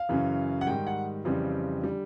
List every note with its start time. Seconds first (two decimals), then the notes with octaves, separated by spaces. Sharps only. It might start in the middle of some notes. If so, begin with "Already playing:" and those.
Already playing: F5
0.09 F#2 C#3 E3
0.61 F#5
0.67 G#2 D#3 G3 G5
0.87 F#5
1.25 F2 C#3 E3 G3 C4
1.84 D3 G3